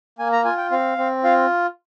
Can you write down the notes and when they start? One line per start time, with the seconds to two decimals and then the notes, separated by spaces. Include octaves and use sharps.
0.19 A#3 G#5
0.32 A#5
0.45 F4 G#5
0.57 G5
0.71 C4 F5
0.98 C4
1.24 F4 F5